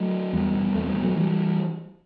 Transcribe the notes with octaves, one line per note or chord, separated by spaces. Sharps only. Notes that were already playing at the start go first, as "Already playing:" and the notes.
Already playing: F#3 A3
E2 G3 B3
B2
E2 A3 C4
G3 B3
B2
F#3 A3
E3 G3